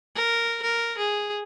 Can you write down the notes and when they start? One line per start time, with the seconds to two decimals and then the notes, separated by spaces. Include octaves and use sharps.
0.15 A#4
0.63 A#4
0.98 G#4